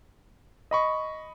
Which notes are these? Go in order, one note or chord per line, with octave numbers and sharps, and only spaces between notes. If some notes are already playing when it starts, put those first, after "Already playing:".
D#5 B5 C#6